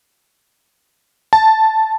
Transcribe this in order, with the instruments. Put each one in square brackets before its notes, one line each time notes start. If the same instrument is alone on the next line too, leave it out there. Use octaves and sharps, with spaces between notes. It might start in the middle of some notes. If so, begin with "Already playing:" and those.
[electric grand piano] A5